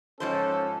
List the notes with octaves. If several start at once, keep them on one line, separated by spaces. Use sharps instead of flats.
G#2 F3 C#4 A4 C5